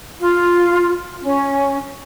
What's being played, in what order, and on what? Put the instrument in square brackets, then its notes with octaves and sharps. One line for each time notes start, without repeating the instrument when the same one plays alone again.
[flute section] F4
C#4